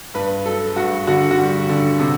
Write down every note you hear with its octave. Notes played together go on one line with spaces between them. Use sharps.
G2 B4
F#3 A4
G2 F#4
D3 F#4
F#4
G3
D3
C3